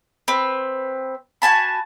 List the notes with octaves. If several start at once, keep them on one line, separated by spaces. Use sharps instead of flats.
C4 B4
F#4 G#5 A5 B5